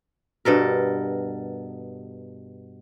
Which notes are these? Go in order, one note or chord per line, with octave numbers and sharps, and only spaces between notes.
G2 B2 A4 A#4